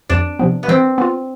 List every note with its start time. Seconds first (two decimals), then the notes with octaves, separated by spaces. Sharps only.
0.10 F2 D4
0.39 C3 F3 B3
0.63 B3
0.68 E3 C4
0.98 B3 F4